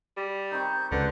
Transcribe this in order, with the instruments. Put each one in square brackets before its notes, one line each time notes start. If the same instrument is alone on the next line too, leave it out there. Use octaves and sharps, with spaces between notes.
[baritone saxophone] G3
[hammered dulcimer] D#3 C4 C#6 [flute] G6
[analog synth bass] C#2 [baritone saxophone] D3 [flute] B4